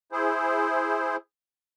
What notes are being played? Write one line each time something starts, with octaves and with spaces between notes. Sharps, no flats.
E4 G#4 C5